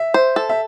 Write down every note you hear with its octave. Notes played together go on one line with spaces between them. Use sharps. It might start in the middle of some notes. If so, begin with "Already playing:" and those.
Already playing: E5
C5
A4
E5